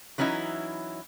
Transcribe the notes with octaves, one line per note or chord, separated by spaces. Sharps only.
E3 F#3 C#4 D#4 E4